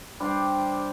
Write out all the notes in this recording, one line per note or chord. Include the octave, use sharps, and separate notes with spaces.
G3 D4 G4 C5